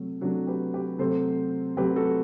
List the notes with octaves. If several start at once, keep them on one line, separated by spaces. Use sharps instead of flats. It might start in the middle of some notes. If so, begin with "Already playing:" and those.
Already playing: C3 F#3 A3
C3 F#3 A3 D4 F#4
G4 B4
G4 B4
C3 F#3 A3 A4 C5
C3 F#3 A3 G4 B4
F#4 A4